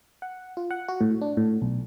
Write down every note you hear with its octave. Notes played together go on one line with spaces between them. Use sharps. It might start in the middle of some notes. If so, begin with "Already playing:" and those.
F#5
F4
F#5
F#4
A2
D4
A2
B1